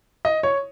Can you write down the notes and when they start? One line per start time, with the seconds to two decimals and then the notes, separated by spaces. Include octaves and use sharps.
0.25 D#5
0.43 C#5